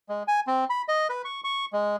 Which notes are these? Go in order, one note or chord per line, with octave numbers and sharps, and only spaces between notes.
G#3
G#5
C4
B5
D#5
B4
C#6
C#6
G#3